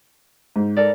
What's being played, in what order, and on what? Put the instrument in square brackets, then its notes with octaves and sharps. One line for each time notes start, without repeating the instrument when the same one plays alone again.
[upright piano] G#2
[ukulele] A4 A#4 D5